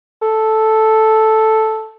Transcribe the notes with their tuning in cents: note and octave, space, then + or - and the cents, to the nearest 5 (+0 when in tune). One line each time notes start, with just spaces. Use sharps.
A4 -5